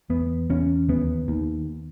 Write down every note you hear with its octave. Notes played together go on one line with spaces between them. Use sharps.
E2 B3
E2 C#4
D#2 B3
D#2